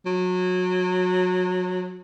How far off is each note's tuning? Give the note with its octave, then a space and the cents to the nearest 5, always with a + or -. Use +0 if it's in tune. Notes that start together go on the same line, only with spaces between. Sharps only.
F#3 -25